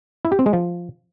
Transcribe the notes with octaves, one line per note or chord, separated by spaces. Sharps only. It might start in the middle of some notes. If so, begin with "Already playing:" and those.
E4
G4
C4
G#3
F3